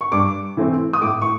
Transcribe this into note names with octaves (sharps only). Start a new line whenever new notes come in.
C#6
G2 D6
E3 A3 C4
D#6
A2 D6
C#6